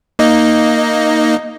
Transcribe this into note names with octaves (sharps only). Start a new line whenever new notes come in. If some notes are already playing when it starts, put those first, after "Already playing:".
A#3 D#4 D#5